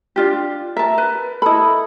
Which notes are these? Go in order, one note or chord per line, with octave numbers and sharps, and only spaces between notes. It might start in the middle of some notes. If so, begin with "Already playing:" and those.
D4 F4 G4
A#4 E5 A5
B4
E4 A4 D#5 B5